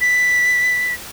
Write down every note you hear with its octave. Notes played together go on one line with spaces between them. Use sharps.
B6